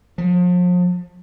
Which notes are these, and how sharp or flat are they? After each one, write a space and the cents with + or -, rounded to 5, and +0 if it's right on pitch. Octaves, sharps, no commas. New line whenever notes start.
F3 +40